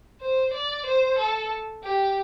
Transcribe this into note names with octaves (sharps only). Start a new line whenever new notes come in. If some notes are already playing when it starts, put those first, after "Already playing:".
C5
D5
C5
A4
G4